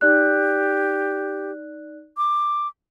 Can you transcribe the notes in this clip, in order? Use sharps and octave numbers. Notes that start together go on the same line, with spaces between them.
D#4 G4 D5 F#6
D6